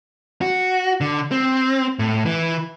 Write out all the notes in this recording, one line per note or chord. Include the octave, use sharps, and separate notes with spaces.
F#4
D3
C4
A2
E3